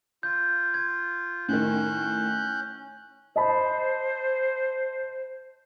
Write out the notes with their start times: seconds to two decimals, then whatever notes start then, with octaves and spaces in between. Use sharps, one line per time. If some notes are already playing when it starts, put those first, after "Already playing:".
0.23 F4 G6
0.74 G#6
1.49 A2 D#3 C#4 F#6 G6
3.36 C5 D#5 A5 B5